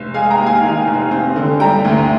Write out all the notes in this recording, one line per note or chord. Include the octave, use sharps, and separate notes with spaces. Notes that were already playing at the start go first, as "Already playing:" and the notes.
Already playing: F1
G#3 F5 G#5
G5 A#5
D#2
F5 G#5
D#3
F1
C4
D3
G3 G5 A#5
D2